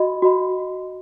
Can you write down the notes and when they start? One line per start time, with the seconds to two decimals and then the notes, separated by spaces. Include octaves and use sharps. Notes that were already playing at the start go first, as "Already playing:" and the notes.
Already playing: F#4 D#5 B5
0.22 F#4 D#5 B5